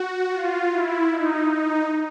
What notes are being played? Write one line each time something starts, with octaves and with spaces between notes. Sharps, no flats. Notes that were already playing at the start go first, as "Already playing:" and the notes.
Already playing: F#4
F4
E4
D#4
D#4